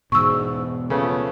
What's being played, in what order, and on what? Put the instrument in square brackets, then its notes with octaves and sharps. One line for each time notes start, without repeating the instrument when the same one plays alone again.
[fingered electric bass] E2 B2 [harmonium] G#2 [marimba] C#6 E6
[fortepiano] C#3 A3 B3 [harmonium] F3